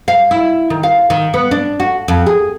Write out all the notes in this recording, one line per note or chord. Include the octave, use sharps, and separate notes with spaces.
F5
E4
D#3
F5
D#3
B3
D4
F#4
F2
G#4